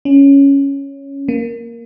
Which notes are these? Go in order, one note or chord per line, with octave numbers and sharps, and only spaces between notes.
C#4
A#3